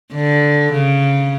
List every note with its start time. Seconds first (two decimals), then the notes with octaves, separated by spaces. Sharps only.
0.14 D3
0.73 C#3